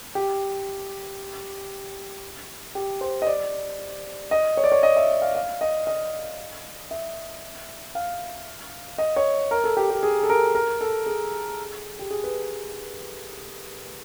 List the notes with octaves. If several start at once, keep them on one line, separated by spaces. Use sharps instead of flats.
G4
G4
C5
D#5
D5
D#5
C#5
D5
C#5
D#5
E5
F5
F5
D#5
D#5
E5
F5
D#5
C#5
A#4
A4
G4
G4
G#4
A4
A#4
A#4
A4
G#4
G4
G#4
B4